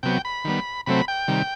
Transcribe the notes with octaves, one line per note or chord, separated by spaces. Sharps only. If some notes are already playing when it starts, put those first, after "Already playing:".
C3 F#3 B3 G5
B5
D#3 G3 B3
C3 F#3 A3 C4 B5
G5
C3 D#3 G3